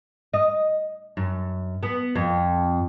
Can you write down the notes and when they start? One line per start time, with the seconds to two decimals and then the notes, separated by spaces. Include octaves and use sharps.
0.34 D#5
1.17 F#2
1.83 B3
2.15 F2